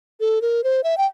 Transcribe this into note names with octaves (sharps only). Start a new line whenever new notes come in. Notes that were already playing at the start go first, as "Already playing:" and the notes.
A4
A#4
C5
E5
G5